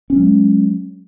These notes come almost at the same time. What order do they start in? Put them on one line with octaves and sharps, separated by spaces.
C#4 F#3 G#3